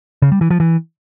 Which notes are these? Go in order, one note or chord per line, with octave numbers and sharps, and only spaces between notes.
C#3
G3
E3
F3
E3